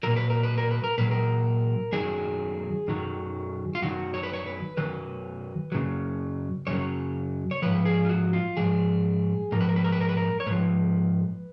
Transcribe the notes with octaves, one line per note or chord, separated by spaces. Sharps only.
A#2 F#3 A#4
B4
A#4
B4
A#4
B4
A#4
A#2 F#3 B4
A#4
F#2 D#3 F#3 G#4
F#2 D#3 F#3
F4
F#2 D#3 F#3 F#4
C#5
B4
C#5
B4
F#2 D#3 F#3 B4
F#2 C#3 F#3
F#2 C#3 F#3 C#5
C#5
G#2 F3 B4
G#4
F4
F#4
F4
G#2 F3 G#4
G#2 F3 A#4
B4
A#4
B4
A#4
B4
A#4
B4
A#4
C#5
G#2 F3 B4